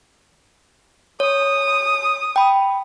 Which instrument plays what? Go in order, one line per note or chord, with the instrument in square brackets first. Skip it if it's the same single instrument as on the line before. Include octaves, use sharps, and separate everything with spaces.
[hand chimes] C#5 [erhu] D#6
[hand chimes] G5 B5